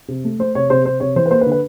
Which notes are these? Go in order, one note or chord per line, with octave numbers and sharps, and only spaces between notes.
C3
A3
A3 C5
C3 C#5
C3 C5
C3 C5
C3 C#5
E3 C5
B4
A#3 C5
B4
D3
B4